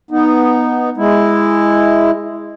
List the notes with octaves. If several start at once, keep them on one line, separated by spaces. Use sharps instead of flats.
B3 D#4
G#3 E4